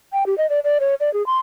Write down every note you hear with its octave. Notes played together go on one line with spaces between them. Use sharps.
G5
G4
D#5
D5
D5
C#5
D5
G#4
C6